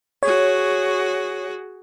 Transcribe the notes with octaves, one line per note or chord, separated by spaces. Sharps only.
F#4 G#4 C#5